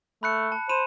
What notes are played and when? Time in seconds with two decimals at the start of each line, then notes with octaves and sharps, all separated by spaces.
0.23 A3 B5 F#6 C#7
0.52 A5
0.69 C5 B5 D#7 E7